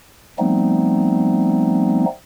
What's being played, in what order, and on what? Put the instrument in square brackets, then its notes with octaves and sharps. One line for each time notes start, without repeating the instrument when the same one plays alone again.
[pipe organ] F3 G3 A3 B3 C4 D#4